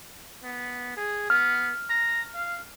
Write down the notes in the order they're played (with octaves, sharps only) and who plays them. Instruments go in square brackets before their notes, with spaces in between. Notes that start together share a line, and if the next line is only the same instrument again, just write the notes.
[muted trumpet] B3
G#4
[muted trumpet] B3 [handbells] F6
[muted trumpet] A#5
F5